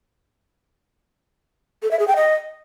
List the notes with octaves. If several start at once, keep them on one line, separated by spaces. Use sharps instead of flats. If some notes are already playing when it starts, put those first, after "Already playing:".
A4
E5
G#4
G5
D#5